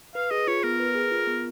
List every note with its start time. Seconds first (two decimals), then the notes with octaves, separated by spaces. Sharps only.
0.15 B4 F5
0.31 G#4 D#5
0.47 F4 C#5
0.63 B3 A#4
0.80 B4
0.95 G#4
1.11 F4
1.27 B3